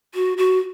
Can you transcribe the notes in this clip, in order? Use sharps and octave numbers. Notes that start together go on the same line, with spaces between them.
F#4
F#4